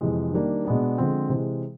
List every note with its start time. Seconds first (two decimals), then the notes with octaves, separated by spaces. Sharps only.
0.01 F2 C3 E3 G#3
0.33 D#3 G3 A#3 D4
0.65 B2 G#3 B3 D4
0.98 D3 F3 G#3 C4
1.29 C3 E3 G#3